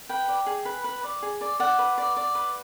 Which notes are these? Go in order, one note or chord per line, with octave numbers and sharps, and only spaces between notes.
B4 G5
D5
G#4
B4
B4
D5
G#4
D5
D5 F#5
B4
D5
D5
B4